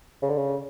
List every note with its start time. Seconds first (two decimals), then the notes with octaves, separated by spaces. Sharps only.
0.22 C#3
0.29 D3
0.37 C#3